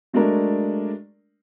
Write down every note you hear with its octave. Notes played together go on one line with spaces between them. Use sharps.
F#3 G#3 A3 D4 A#4 D5